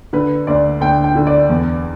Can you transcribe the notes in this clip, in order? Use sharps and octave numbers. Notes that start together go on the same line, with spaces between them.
D3 B4
D2 D5
D2 G5
G5
D3
D5
E2